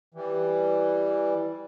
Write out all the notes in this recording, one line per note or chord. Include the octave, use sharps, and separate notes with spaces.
E3 G3